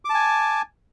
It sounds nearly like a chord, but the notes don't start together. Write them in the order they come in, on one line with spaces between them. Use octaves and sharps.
D6 A5 G#5